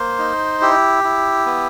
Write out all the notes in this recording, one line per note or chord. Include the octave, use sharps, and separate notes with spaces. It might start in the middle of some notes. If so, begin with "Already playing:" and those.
Already playing: A#3 C5
D#4
E4 G4
E4
B3